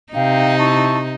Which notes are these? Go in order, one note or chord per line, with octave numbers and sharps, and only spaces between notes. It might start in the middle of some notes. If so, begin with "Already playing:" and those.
C3 D#4 F5 G5
E4 A5 C#6